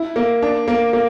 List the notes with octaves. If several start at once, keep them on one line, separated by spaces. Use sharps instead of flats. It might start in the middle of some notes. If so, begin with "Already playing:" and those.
Already playing: E4
A#3
D4
A#3
A#3